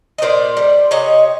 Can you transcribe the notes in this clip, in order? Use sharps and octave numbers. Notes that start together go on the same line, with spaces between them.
D#5
A#2 C5 D5
G3
C3 C#5 D#5